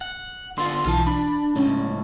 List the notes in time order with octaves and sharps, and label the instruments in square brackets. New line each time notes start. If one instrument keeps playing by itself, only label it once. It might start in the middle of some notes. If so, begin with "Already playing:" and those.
[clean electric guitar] F#5
[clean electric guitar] D3 B3 F4 [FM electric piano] C6
[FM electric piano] B1 E3 [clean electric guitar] F4 A5
[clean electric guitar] D4 [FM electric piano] B5
[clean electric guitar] C#2 A2 [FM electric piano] C#4